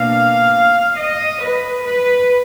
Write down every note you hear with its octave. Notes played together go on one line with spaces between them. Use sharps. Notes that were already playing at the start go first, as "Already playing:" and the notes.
Already playing: B2 A#3 D4 F5
D#5
B4
B4